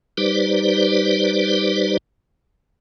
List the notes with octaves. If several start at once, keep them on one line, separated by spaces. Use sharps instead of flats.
G3 D#4 G4 B4 C5 D5